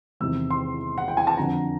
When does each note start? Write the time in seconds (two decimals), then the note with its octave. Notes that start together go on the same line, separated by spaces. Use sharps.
0.20 E2 C3 D#3 G#3 E6
0.51 C6
0.98 F#5
1.08 G5
1.17 G#5
1.27 A5
1.37 F2 D3 F3 A#5